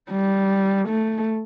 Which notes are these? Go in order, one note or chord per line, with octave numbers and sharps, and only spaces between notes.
G3
A3